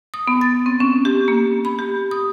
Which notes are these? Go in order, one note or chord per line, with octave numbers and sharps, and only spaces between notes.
D#6
B3
A6
C4
C#4
G4
A#3
B5
G4
D#6